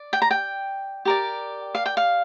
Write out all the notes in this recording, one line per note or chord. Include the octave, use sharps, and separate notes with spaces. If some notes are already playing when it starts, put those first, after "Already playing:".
Already playing: D5
G5
A#5
G5
G4 A#4 D5
F5
G5
F5